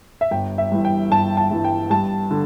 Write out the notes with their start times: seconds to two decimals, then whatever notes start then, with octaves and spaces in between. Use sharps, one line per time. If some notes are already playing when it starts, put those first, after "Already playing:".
0.21 E5
0.31 G1 G5
0.58 E5
0.72 G2 E3
0.85 G5
1.11 G1 A5
1.37 A5
1.51 G2 E3
1.64 G5
1.90 G2 A5
2.31 D3